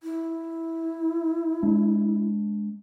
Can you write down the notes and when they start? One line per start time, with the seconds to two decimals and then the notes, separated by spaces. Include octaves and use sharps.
0.03 E4
1.63 G#3 D4